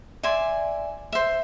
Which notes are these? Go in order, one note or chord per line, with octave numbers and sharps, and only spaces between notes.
D5 E5 G#5 C6
C5 E5